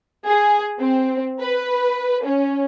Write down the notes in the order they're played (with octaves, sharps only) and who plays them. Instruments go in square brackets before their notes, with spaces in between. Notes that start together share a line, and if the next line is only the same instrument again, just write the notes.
[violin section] G#4
C4
B4
C#4